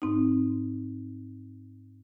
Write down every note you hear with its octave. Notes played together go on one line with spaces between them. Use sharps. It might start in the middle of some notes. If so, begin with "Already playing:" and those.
G#2 C4 D#4